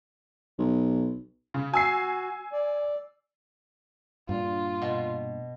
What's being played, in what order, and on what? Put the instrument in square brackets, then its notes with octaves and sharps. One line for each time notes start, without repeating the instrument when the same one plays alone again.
[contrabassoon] B1
[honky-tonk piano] C#3
[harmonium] F#4 [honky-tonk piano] G#5 E6 C7
[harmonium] D5
[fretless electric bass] G2 A#2 D4 [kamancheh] F4
[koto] B2